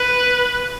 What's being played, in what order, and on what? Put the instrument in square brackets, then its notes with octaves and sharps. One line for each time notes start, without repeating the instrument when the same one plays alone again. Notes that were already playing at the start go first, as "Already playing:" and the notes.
Already playing: [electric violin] B4